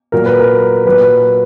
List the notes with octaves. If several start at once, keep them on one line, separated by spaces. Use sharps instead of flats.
A#2 F#3 A#4
B4
A#4
A#2 F#3 B4